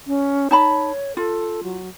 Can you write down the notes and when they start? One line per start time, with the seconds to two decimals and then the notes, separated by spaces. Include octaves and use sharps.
0.07 C#4
0.51 D#4 C#5 A5 B5
1.17 F4 A4
1.64 F#3